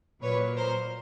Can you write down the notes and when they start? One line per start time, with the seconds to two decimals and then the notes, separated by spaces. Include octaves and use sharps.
0.22 A#2 F#3 B4 C#5
0.57 A#4 C5